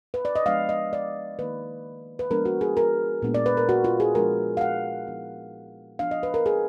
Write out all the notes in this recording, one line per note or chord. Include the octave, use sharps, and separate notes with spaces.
B4
D5
D#5
F3 G#3 B3 D4 F5
D#5
D5
D#3 A#3 D#4 B4
B4
F3 G#3 B3 D4 A#4
F#4
G#4
A#4
A#2 G#3 B3 D4
D5
B4
A#4
F#4
F4
G#4
F3 G#3 D4 A#4
F5
F#5
F3 B3 D#4
F3 B3 D4 F5
D#5
B4
A#4
G#4